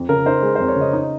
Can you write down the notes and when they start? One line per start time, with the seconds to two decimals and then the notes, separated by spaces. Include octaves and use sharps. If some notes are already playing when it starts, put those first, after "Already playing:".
Already playing: F2
0.09 C#3 A#4
0.26 D#4 C5
0.42 G#3
0.55 F2 C5
0.68 C#5
0.76 C#3 D#5
0.93 D#4